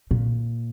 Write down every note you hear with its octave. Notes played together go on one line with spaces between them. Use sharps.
A#2